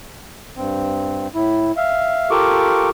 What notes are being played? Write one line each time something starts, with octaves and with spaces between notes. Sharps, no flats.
G2 C4
A2 E4
E5 F5
F4 G4 A4 A#4 C#6 D6